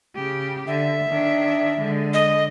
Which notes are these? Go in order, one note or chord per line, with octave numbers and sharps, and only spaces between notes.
C#3 G4
D3 E5
D#3 D4
D3 G#3
D#5